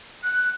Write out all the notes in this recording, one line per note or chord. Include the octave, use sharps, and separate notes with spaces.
F#6